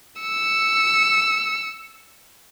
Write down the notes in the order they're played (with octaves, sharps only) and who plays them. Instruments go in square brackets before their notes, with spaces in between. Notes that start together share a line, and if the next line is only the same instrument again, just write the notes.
[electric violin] E6 C#7